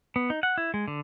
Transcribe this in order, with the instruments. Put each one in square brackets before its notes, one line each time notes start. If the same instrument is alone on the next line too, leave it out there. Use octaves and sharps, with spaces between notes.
[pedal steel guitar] B3
D#4
F#5
E4
G#3
D3